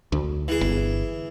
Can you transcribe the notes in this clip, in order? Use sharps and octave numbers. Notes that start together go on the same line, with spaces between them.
D2
E3 G#4
G1